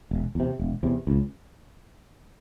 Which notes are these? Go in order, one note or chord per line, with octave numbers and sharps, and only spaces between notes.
E1
E2 C3
E1
E2 C3
C#2